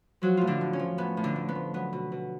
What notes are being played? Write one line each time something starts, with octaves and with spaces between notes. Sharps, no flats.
F3 F#3 F#4
A2 F4
D3 D4
A2
C#4
F3
A2 B3
A2
D3 D4
A2
B3
F3
F#3 B3
B2
B2